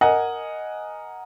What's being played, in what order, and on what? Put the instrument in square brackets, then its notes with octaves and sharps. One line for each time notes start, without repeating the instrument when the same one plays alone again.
[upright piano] A#4 D#5 F#5 G#5